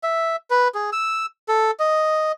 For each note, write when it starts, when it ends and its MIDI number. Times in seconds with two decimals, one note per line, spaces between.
0.03 0.36 76
0.50 0.68 71
0.74 0.90 68
0.92 1.26 88
1.48 1.71 69
1.79 2.32 75